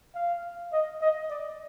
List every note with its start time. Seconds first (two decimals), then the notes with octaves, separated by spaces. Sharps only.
0.15 F5
0.73 D#5
1.01 D#5
1.30 D5